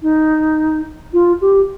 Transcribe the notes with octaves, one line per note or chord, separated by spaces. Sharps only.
D#4
F4
G4